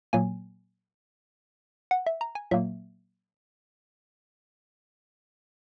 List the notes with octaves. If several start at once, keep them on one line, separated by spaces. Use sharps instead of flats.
A#2 F#3 A#3 G#5
F#5
E5
A#5
G#5
A#2 F#3 A#3 E5